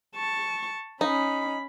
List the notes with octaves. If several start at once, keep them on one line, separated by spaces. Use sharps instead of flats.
A5 C#6
C#4 D#4 B5